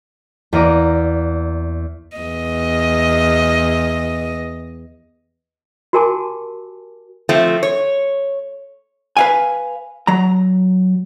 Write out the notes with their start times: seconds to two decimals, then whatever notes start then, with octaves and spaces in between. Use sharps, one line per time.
0.53 E2 A#3 D5 D#5 A#5 D7
2.17 E2 D#5
5.93 F#4 G4 A#4 G#5 A5 D6
7.29 F3 A3 C4
7.63 C#5
9.17 B4 F5 G#5
10.07 F#3 A#5